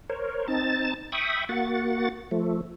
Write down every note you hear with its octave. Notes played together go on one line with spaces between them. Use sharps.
A#4 C5 C#5
C4 D#4 A5 A6
E5 G5 B5 C#6 D#6
A#3 F#4 F#5 A6
F3 A3